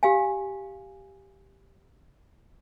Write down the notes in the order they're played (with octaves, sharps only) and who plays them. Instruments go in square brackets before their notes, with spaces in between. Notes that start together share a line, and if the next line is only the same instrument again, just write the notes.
[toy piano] G4 F5 G#5